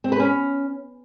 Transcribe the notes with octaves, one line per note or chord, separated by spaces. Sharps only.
C4
B4
C#4